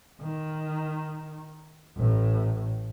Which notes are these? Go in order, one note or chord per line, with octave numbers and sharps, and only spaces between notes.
D#3
A1 A2